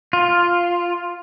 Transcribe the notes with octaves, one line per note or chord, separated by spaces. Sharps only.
F4